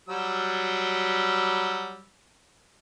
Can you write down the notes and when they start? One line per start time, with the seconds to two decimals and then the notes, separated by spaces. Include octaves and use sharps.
0.09 F#3 G3 E6